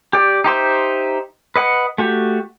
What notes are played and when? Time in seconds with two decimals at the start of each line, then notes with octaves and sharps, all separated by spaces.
0.13 G4 D5
0.44 D#4 G4 C5 E5
1.56 B4 D#5 F#5
1.98 A3 F#4 G4